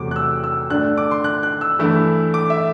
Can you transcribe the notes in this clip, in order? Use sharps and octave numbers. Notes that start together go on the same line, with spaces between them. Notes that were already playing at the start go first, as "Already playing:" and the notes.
Already playing: E2 C3 F#3 A3 D6
F#6
E6
E6
G2 D3 A3 D4 F#6
D6
C6
F#6
F#6
E6
G2 E3 A3 E4
D6
E5